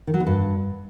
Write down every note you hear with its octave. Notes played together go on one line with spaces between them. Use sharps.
D#3
F#3
E2
G2